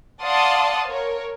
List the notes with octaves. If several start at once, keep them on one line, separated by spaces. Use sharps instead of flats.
D5 F5 F#5 A5 C6 D#6
A#4 C#5